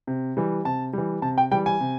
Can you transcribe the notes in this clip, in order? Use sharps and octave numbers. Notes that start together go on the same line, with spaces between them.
C3
E3 G3
C3 A5
E3 G3
C3 A5
G5
E3 G3 G5
G#5
C3